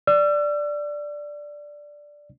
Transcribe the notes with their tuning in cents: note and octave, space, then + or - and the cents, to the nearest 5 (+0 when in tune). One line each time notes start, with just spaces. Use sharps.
D5 +0 E6 +45